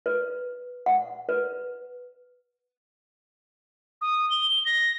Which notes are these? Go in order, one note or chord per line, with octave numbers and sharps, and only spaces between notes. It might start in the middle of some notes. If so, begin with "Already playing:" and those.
B4
F#5
B4
D#6
G7
A#6